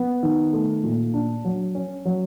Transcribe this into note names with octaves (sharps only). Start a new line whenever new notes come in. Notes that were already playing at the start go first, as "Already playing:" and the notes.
Already playing: B3
D#3
A3
A#2
D4
F#3
C#4
F#3